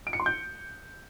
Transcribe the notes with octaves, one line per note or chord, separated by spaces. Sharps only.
D7
C#7
C6
G6